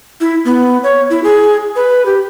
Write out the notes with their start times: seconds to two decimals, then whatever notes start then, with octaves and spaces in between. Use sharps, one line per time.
0.21 E4
0.45 B3
0.83 C#5
1.10 E4
1.24 G#4
1.76 B4
2.06 G4